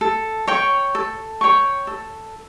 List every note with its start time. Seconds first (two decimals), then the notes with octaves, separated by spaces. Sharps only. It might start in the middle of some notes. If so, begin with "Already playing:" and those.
0.01 A4
0.47 C#5 G5 C#6
0.95 A4
1.41 C#5 G5 C#6
1.87 A4